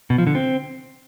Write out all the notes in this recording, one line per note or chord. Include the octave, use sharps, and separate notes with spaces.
B2
F3
D3
C4